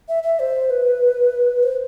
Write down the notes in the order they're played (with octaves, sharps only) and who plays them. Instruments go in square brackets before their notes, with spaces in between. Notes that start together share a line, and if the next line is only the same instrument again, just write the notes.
[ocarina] E5
E5
C5
B4
C5